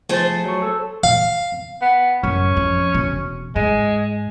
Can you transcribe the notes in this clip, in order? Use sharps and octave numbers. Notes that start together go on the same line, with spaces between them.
F3 A3 G#4 C5 A6
F#3 C#6
A4
F5
B3
F#2 C#4
F2
E1
G#2 G#3